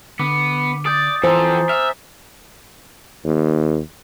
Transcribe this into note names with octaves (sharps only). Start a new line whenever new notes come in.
D3 B3 D6
D5 D#6 G6 A6
E3 F3 F4 A4 C5 G#5 A#5
E5 F6
D#2